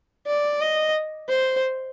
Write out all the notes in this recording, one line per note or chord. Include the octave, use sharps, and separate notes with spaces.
D5
D#5
C5